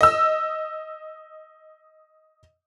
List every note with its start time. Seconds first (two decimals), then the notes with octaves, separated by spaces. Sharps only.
0.01 D#5 E6